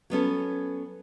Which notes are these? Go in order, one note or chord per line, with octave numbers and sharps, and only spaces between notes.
F#3 B3 C#4 A4